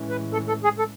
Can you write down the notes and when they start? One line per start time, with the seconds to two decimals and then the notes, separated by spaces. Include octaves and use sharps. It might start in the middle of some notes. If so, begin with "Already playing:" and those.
Already playing: A2 E3 G#3 C#4
0.10 B4
0.33 A4
0.48 A4
0.64 G#4
0.79 A4